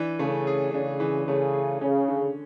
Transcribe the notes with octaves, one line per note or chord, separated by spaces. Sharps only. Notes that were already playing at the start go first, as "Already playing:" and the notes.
Already playing: E3 D4
C#3 A3
G#4
C#3 D4
E3
C#3 A3
G#4
C#3 C#4
D3